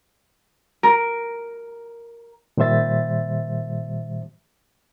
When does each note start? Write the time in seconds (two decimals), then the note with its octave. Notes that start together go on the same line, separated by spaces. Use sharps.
0.83 A#4
2.57 A#2 D#3 G3 C5 E5 A6